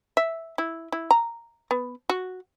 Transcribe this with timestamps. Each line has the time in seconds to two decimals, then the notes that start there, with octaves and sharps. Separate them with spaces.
0.17 E5
0.58 E4
0.92 E4
1.11 A#5
1.71 B3
2.10 F#4